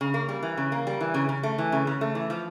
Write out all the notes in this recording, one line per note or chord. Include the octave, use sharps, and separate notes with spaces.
C#3
A#3
G3
E3
C#3
A#3
G3
E3
C#3
C#3
A3
E3
C#3
C#3
A3
E3
F3